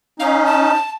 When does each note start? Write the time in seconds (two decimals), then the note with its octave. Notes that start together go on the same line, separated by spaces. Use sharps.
0.20 C#4 D#4 F5
0.46 A5